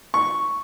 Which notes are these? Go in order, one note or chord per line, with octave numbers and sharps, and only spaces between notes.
C#6